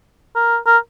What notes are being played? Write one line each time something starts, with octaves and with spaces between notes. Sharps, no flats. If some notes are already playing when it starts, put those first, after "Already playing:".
A#4
A#4